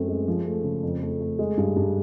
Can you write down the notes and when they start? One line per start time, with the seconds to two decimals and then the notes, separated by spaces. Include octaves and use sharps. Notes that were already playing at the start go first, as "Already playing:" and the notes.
Already playing: F#2 A3 C4
0.08 G#3
0.28 F3
0.46 A3
0.64 C#3
0.83 F2
1.02 A3
1.20 A3
1.39 G#3
1.58 G2
1.76 G2